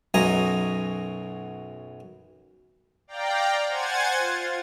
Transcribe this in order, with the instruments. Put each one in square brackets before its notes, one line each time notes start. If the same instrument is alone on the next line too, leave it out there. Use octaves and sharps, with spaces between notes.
[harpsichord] B1 F#2 D#5 G#5 A#5
[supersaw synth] D5 F5 G5 A#5
C5 F#5 G#5 G#6 A6
F4